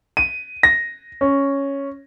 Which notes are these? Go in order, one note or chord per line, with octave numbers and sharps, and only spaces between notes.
D#7
A#6
C#4